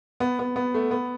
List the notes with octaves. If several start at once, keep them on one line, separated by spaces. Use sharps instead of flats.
B3
B3
B3
A3
B3